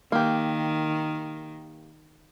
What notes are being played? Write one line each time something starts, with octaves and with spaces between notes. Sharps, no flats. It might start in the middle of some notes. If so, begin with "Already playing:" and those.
D#3 A#3 G4